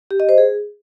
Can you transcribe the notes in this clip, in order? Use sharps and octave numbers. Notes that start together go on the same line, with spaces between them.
G4
D#5
C5
G#4